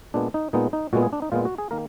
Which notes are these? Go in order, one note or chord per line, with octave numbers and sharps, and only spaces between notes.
A#2 G#3 B3 D4
D#4
A#2 G#3 B3 D#4
D#4
A#2 G#3 B3 F#4
G#4
D4
D#4
A#2 G#3 B3 F4
F#4
G#4
D#3 A#3 A#4